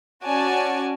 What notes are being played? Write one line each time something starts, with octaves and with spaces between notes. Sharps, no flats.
C#4 F#4 D5 G#5 A5